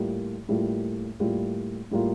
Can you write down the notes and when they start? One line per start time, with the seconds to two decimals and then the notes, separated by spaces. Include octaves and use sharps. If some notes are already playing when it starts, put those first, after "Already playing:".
Already playing: A2 G3 A#3 F4
0.49 A2 G3 A#3 F4
1.20 A2 G3 A#3 F4
1.91 A2 G3 A#3 F4